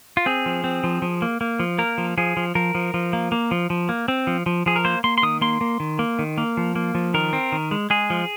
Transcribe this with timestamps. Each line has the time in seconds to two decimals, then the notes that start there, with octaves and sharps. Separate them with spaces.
0.17 F4
0.26 C4 G#4
0.46 F3
0.64 C4
0.84 F3
1.02 F3
1.22 A#3
1.41 A#3
1.60 F3
1.78 A#3 A#4
1.98 F3
2.18 F3 G#4
2.37 F3
2.55 F3 A#4
2.75 F3
2.94 F3
3.13 A#3
3.32 A#3
3.51 F3
3.70 F3
3.89 A#3
4.08 C4
4.27 F3
4.46 F3
4.66 F3 G#4
4.76 A#4
4.85 A#3 C5
5.04 A#3 C6
5.18 C6
5.23 D#3 D#6
5.41 A#3 C6
5.61 A#3
5.80 D#3
5.99 A#3
6.19 D#3
6.38 A#3
6.57 F3
6.76 A#3
6.95 F3
7.14 D#3 A#4
7.33 C4
7.52 D#3
7.71 G#3
7.90 G#3 G#4
8.10 F3